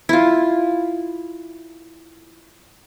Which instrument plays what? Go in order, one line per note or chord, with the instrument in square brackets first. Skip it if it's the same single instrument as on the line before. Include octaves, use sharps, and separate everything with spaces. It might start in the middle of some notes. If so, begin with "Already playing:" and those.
[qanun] E4 F4